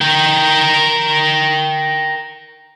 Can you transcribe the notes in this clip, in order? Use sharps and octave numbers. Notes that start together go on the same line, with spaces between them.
A#4 G5